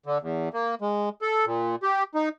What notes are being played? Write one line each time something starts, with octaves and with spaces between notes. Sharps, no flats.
D3
E2
A#3
G#3
A4
A#2
G4
D#4